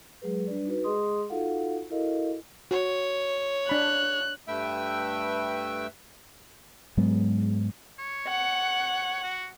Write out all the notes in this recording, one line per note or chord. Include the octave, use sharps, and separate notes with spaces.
F#3 G#3 G#4 B4
G3 D4 B4 D5
D#4 F#4 B4
G#3 G#4 D#5 C6 D#6
D#4 F4 F#4 A4 F5 F#5
E4 F#4 A4 A#4 D#5 F5
F#4 C#5
D4 B5 F#6
G2 A3 B4 E5 G5 E6
G#2 F#3 G#3 B3
C#5
F#5
F#4